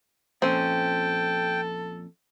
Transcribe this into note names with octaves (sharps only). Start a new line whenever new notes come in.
F2 A#2 C4 C#4 A4 C5 G5